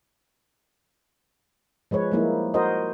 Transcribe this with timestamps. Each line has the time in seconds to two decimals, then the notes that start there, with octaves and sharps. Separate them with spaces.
1.91 F3 G#3 B4 C#5
2.12 F3 G3 G#3 A#3 D#4 E4
2.54 F#4 A#4 C5 D#5